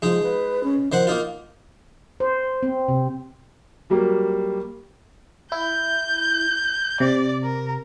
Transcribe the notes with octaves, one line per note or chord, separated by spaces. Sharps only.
F3 G#3 D#4
B4
C#4
D#3 F3 C5 F#5
A#3 D#4 F4
C5
C4
C3
F#3 G3 A#3
E4 G6
C3 D5
A#4